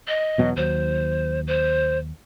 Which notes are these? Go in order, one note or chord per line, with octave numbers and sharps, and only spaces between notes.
D#5
E2 B2 F#3
D#2 F#3 C5
C5